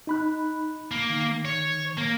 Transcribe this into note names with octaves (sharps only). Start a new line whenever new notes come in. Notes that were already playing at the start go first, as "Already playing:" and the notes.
D#4 B5 F#6
A#3
D#3
C#5
A#3